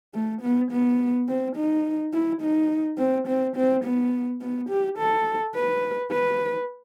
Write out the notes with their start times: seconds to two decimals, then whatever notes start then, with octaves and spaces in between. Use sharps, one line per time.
0.14 A3
0.42 B3
0.71 B3
1.28 C4
1.56 D#4
2.13 E4
2.41 D#4
2.98 C4
3.27 C4
3.56 C4
3.84 B3
4.41 B3
4.69 G4
4.98 A4
5.55 B4
6.12 B4